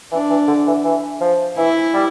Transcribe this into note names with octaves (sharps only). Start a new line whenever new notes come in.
E3 D4
E3
D3
E3
E3
F3
E3 E4
G3